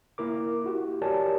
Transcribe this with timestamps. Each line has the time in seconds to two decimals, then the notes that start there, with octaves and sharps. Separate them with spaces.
0.18 A#3 E4 A#4 D6
0.64 E4 F#4 G4
1.02 G4 A#4 C#5 D5 G#5 A5